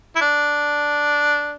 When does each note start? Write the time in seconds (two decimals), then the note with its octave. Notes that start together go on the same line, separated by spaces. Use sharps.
0.16 E4
0.21 D4